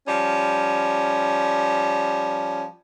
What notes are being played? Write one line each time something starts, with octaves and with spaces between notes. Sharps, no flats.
F3 G3 C#4